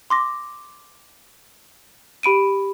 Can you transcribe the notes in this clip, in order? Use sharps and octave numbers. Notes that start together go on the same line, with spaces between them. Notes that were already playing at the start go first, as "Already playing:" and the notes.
C6 D6 A#6
G4 B5 D7 D#7